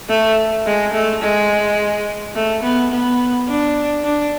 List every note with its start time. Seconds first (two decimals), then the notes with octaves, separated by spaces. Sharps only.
0.09 A3
0.66 G#3
0.93 A3
1.22 G#3
2.36 A3
2.63 B3
2.92 B3
3.48 D4
4.05 D4